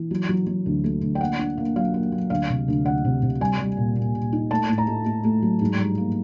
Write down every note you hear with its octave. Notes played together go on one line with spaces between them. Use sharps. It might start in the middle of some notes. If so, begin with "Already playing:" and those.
Already playing: E3
F#3
F#3
F#3
D2
A3
D2
G5
A#3 F#5
D4
A#3
F#3 F5
A#3
F#3
D2 F5
C3
D2
D2 F#5
C3
C3
G3 G#5
G3
A#2
A#2
A#2
D#4
A3 A5
A2
A#5
A3
A3
A3
F#3
G#2
G3
A#3